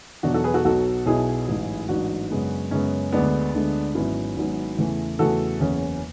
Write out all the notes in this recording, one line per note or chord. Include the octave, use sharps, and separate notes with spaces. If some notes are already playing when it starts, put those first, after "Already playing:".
E2 B2 F#3 D4 F#4
F#4 A4
G#4 B4
F#4 A4
B1 B2 F#3 F#4 A4
B1 B2 F#3 E4 G#4
A1 G#2 F#3
A1 G#2 F#3 D4 F#4
F#2 C#3 G#3 B3
F#2 C#3 G#3 B3 C#4
D2 D3 G#3 B3 D4
D2 D3 G#3
G#1 G#2 F#3 B3 C#4 E4
G#1 G#2 F#3 B3
E2 C#3 E3 A3
E2 C#3 E3 A3 F#4 A4
F#1 E2 C#3 C#4